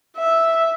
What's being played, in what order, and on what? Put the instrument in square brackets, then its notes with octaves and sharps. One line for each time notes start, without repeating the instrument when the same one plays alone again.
[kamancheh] E5